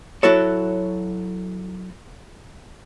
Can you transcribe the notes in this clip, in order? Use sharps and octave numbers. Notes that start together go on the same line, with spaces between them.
F#3 E4 F#4 A4 C#5